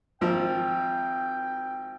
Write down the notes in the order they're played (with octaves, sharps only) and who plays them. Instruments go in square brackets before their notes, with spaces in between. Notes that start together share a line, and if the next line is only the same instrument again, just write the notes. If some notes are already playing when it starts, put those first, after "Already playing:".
[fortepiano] G#1 F3 [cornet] G5